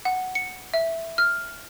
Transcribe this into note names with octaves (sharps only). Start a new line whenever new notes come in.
F#5
C#7
E5
F6